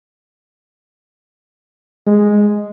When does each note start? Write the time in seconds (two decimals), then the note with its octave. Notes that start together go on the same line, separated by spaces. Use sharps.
2.07 G#3